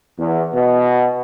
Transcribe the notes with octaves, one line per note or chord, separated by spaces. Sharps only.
E2
B2